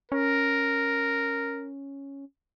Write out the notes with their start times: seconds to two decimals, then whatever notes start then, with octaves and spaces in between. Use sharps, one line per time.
0.12 C#4 A#4